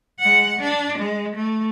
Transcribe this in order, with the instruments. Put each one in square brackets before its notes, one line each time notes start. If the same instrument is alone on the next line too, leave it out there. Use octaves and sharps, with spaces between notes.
[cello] G#3 F#5
D4
G#3
A3